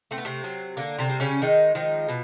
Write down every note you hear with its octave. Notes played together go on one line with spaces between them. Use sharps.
A3 C4
B3
C3 C4
F#3
D3 A#3
C3 C4
G3
C#3 C#4
D#3 G#3 D#4
D#3 F3 D#4
B2